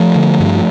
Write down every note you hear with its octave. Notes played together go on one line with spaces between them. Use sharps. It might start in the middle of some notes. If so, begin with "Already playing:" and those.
Already playing: F3 A3
D3
G2